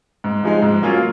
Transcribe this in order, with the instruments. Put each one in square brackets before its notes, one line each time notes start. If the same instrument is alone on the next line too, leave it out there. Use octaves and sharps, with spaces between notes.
[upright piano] G#2
F3 G#3 D#4
G#2
F#3 A#3 C#4 F4